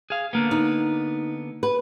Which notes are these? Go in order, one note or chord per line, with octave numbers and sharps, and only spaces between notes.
G#4 F5
D3 A#3 B3
D#4
B4